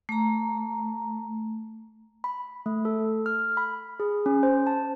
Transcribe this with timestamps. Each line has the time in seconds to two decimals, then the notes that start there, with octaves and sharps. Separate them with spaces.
0.09 A3 A#5
2.24 B5
2.66 A3
2.85 A4
3.26 F6
3.57 B5
4.00 G#4
4.26 C#4
4.43 C5
4.67 A5